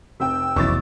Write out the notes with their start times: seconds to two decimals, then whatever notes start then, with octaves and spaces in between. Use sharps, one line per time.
0.20 F1 C4 G5 E6
0.56 F1 B1 E2 E4 C#6 D6 A6